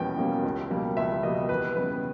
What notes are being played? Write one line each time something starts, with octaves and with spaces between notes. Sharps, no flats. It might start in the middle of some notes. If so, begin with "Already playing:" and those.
Already playing: E2 B2 G3 A#3 C#4 G5
B2 G3 A#3 C#4
C#2
B2 G3 A#3
C#2 E5
B2 G3 A#3 D#5
E2 B4
C#3 G3 B3 B4